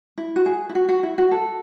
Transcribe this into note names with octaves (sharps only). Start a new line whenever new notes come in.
E4
F#4
G#4
E4
F#4
F#4
E4
F#4
A4